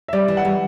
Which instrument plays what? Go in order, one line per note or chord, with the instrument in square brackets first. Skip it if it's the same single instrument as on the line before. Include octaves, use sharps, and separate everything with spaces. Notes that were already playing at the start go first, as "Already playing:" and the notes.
[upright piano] E5
[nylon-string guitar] G3 [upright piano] D5
[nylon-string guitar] E3
[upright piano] F#5
[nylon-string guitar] G3